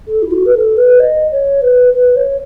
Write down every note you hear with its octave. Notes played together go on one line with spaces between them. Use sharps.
A4
E4
F#4
B4
A4
B4
D#5
C#5
B4
B4
C#5